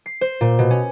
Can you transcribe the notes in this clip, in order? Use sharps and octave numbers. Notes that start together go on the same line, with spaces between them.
C7
C5
A#2
B2
C#4